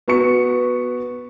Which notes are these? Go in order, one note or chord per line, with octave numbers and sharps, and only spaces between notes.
B3 F#4 B4 C#6 C#7